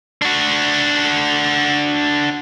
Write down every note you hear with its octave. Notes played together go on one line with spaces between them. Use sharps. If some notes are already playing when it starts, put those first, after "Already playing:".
D4 F#4